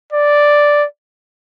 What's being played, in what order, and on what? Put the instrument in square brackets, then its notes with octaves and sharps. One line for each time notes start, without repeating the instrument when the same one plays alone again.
[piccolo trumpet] D5